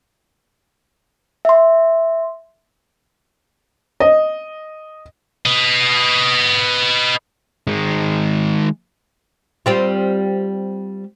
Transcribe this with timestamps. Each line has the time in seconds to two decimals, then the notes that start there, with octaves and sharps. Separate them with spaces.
1.45 E5 C6
4.00 D#5
5.46 B4 D#5
7.67 D#3 G#3
9.66 G3 C4 F4